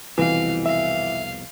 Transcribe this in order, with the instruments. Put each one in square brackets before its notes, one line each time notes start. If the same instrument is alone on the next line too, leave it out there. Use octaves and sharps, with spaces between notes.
[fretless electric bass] C2 F2 B2 [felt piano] E3 [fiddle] F5
[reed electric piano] E5 [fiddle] F5